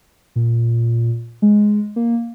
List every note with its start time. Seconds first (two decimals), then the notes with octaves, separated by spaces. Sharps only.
0.36 A#2
1.42 G#3
1.96 A#3